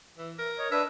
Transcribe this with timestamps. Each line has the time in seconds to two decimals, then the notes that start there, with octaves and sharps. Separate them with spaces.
0.18 E3
0.39 A#4
0.58 C#5 D#5
0.72 D4 B4 E5